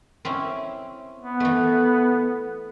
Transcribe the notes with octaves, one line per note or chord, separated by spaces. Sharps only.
C4 C#4 E4
B3
E3 A3